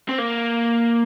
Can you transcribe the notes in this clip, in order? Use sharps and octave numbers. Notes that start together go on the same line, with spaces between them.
C4
A#3